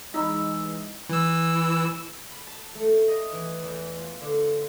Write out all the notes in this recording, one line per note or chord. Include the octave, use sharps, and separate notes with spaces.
E3 G#3 D#4 D#5 A#5 B5 E6
E3 E6
B5
A5
A3
D#5
E3
E2
F4
D3